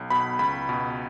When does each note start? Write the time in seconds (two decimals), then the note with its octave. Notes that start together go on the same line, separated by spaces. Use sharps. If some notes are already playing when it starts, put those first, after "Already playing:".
Already playing: B1
0.10 B2 B5
0.39 C#2 B5
0.69 B2